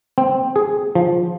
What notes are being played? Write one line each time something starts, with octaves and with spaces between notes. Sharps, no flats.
C4
G#4
F3